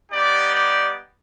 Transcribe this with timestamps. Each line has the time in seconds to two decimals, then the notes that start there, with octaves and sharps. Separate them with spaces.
0.11 G3 B3 D#4 G4 D5
0.54 D5